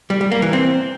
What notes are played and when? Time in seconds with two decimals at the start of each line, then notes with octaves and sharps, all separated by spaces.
0.10 G3
0.21 G3
0.32 A#3
0.42 E3
0.53 C4